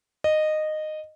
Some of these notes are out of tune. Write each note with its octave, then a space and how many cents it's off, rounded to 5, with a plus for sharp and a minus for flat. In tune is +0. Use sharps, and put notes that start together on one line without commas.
D#5 -15